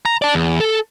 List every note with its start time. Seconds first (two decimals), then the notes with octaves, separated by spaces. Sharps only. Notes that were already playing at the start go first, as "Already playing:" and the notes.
0.05 A#5
0.22 D5 A5
0.34 E2
0.60 A4